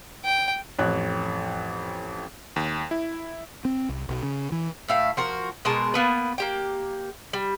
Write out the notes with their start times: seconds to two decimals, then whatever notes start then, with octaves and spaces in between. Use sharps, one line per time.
0.25 G5
0.79 A1 F2 C#5 F#6
2.56 D#2
2.91 E4
3.65 C4
3.89 C2
4.09 B1
4.23 C#3
4.52 E3
4.88 A2 E5 F5
5.17 F3 F#4 A#4
5.65 B2 G#3 A#4 A5
5.94 A#3 B3 B4
6.38 A#3 G4 G5
7.33 G3